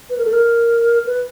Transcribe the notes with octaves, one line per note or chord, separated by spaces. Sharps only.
B4
A#4
A4
A#4
B4